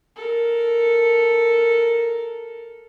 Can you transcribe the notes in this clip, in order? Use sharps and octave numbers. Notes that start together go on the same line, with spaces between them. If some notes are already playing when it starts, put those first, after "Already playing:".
A4 A#4